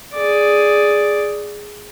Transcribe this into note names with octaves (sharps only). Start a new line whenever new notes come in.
G#4 D5